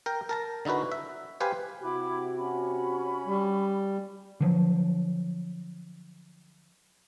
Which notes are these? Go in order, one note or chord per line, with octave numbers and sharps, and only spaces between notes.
A#4 G5
A#4 A5 A#5
D3 D#4 E4 F#4 B4
E5
G4 B4 C5 F5 G#5
C3 E4 F#4 B5 D6
C#4 B5
G3
D3 F3 F#3